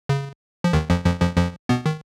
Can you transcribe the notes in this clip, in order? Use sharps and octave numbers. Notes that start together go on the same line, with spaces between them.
C#3
F3
D#2 D#3
F2 F3
F2 F3
F2 F3
F2 F3
B2 B3
D#3